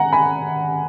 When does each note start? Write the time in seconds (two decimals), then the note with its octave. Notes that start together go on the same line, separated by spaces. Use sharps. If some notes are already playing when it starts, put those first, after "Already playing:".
Already playing: F#5 G#5 A#5
0.13 G#5 B5